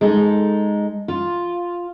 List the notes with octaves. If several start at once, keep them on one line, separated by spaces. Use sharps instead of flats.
G#3 D#4 A4
F4